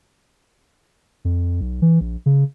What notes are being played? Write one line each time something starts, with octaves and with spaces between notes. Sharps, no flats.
F2
B1
E3
A#1
C#3